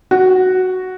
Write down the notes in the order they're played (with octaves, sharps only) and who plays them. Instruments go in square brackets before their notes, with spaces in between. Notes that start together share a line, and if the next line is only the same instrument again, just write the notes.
[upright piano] F#4